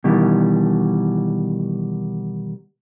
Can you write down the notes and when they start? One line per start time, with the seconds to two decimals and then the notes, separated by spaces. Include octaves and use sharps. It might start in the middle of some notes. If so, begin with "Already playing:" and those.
0.04 B2 D#3 E3 G3